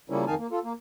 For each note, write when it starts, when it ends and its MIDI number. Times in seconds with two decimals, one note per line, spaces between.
0.10 0.25 49
0.10 0.25 53
0.10 0.25 55
0.10 0.25 58
0.10 0.25 61
0.10 0.25 64
0.27 0.35 41
0.27 0.35 51
0.27 0.35 63
0.27 0.35 77
0.27 0.35 80
0.27 0.35 81
0.39 0.47 58
0.52 0.59 65
0.52 0.59 69
0.64 0.73 58